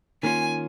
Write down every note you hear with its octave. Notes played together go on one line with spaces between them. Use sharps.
D#3 A#3 C#4 F4 G#5